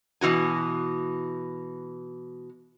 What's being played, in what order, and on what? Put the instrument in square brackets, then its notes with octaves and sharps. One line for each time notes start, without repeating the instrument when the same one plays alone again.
[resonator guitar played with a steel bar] B2 E3 F#4 G#5